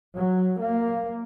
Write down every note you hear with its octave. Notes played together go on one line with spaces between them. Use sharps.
F#3
A#3